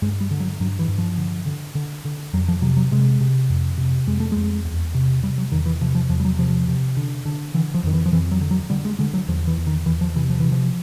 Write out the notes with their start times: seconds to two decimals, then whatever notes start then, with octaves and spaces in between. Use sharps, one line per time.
0.02 G2 G#3
0.21 G3
0.31 D3
0.40 F#3
0.60 G2 F#3
0.79 E3
0.88 G2
0.98 F3
1.18 D3
1.46 D3
1.75 D3
2.05 D3
2.33 F2 F#3
2.48 F3
2.62 C3 F#3
2.77 F#3
2.92 C3 G#3
3.21 C3
3.49 F2
3.78 C3
4.07 F2 G#3
4.20 A3
4.32 F2 G#3
4.65 E2
4.95 C3
5.23 C3 G3
5.38 F#3
5.52 E2 D#3
5.66 E3
5.81 C3 F3
5.95 F3
6.09 E2 F3
6.20 G3
6.25 F#3
6.39 C3 F3
6.68 C3
6.97 D3
7.25 D3
7.54 D3 E3
7.75 F3
7.83 F2 D#3
7.94 E3
8.06 F3
8.12 F2 E3
8.32 F#3
8.41 D3
8.51 F#3
8.70 D3 G3
8.85 G#3
8.99 D3 G#3
9.14 F#3
9.28 E2 F3
9.47 E3
9.57 E2
9.67 D#3
9.86 E2 E3
10.01 F3
10.15 C3 E3
10.30 F3
10.40 C3 E3
10.51 F3